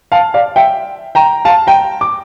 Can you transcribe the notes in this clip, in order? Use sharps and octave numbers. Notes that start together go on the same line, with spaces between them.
F5 A5
D5 F5
E5 G5
G5 A#5
F5 A5
G5 A#5
D6